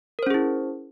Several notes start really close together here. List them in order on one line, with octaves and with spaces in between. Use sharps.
A#4 C5 C#4 G#4 E4